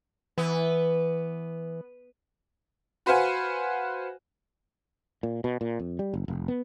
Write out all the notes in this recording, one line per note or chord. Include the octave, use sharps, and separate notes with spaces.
E3 B3
F#4 B4 C5 F5 F#5 G#5
A#2
B2
A#2
F2
G3
F#1
F1
B3